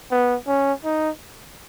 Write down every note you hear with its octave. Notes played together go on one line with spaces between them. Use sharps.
B3
C#4
D#4